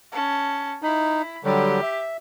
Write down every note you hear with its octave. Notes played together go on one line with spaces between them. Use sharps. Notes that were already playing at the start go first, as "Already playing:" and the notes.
C#4 A5
D#4 E4 B5
D3 F#3 G3 G4
E5